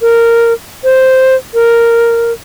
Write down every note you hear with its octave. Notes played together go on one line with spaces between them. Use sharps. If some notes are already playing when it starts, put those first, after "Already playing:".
A#4
C5
A#4